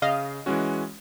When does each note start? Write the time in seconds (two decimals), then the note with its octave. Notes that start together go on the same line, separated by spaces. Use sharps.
0.02 C#3 D#5 F5
0.46 E3 G#3 C#4 F#4